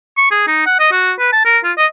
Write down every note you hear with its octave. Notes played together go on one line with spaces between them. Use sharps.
C#6
G#4
D#4
F#5
D#5
F#4
B4
A5
A#4
F4
D#5